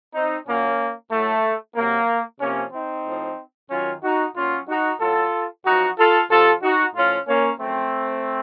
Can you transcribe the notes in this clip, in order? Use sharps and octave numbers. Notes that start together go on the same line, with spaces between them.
C4 D#4
A#2 F#3 A#3 C#4
A2 F#3 A3
C3 F#3 A#3
C3 F3 A#3 C#4
C4 D#4
A2 F3
F#2 D#3 F#3 C#4 F4
D#4 F#4
A#2 F#3 C#4 F4
D#4 F#4
A2 F#3 F4 A4
F#2 F3 D#4 F#4
F4 A4
C3 F3 F4 A4
D#4 F#4
A2 F3 C#4 F4
A#3 C#4
F#2 F3 A3 C4